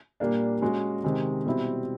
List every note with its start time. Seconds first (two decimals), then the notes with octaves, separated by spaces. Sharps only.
0.20 A#2 G3 A#3 D4
0.62 G#3 C#4 F#4
1.04 C3 D#3 G#3
1.46 B2 G3 C4 E4